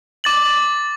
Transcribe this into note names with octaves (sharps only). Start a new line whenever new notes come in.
D6 A6 F#7